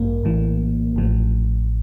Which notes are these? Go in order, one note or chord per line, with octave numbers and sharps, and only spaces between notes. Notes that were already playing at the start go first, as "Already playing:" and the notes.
Already playing: A1 G2 A#3
A#1 A2 E3
A1 A2 F3